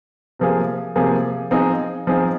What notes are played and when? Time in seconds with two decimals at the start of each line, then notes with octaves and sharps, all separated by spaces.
0.39 C3 F3 A#3 G#4
0.96 C3 F3 A#3 G#4
1.51 F3 C4 D#4 G#4
2.07 F3 C4 D#4 G#4